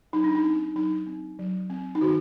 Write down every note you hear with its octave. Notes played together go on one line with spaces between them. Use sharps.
F#3 D#4
D4
D#4
C4
F#3 D#4
C4
F#3
C4
D#4
D#3 F#4